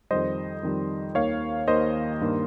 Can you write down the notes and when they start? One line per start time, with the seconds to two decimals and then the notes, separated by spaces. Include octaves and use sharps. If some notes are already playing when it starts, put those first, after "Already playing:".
0.11 F2 D#3 G3 C5 D#5
0.63 F2 D#3 G3
1.15 D#2 D#3 A#3 C#5 F5
1.68 D#2 D#3 A#3 C5 D#5
2.21 G2 D#3 A#3